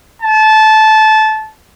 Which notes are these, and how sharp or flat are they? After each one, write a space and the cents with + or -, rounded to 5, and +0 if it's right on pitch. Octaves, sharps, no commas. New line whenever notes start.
A5 -20